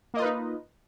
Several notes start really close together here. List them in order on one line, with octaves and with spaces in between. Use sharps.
A#3 D#5 F4 B4 D#4